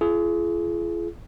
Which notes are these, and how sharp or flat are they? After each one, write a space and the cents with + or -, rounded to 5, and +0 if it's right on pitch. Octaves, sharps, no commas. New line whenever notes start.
F4 -45 G#4 +30